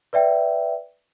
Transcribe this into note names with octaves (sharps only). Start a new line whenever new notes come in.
B4 D5 E5 G5